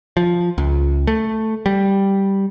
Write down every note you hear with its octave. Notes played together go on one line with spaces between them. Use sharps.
F3
C#2
A3
G3